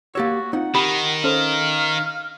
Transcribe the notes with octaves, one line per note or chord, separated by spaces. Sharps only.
A#3 F#4 G4 C#5 E6 A6
C4 D#4 F4 F#5
D#3 G4 B5
C#4 A4 C5 F5